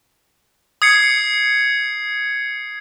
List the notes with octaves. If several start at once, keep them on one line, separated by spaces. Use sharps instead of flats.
D#6 G#6 C7 C#7